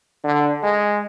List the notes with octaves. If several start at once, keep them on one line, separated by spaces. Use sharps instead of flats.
D3
G#3